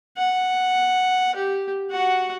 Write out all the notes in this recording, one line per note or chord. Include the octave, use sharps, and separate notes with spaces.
F#5
G4
F#4 F#5